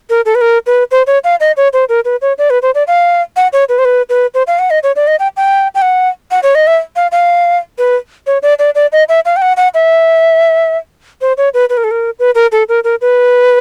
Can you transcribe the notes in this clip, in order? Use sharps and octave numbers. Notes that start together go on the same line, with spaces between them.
A#4
A4
B4
A#4
B4
C5
C#5
F5
D#5
C#5
C5
A#4
B4
C#5
D5
B4
C5
D5
F5
F#5
C#5
B4
C5
B4
B4
C5
F5
F#5
D#5
C#5
D5
D#5
G5
G5
G5
F#5
F#5
C#5
D#5
E5
F5
F5
B4
C#5
D5
D5
D5
D#5
E5
F5
G5
F#5
F#5
E5
C5
C#5
B4
B4
A#4
A4
A#4
B4
A#4
A4
A#4
A#4
B4